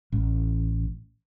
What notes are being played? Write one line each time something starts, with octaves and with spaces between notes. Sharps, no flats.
A1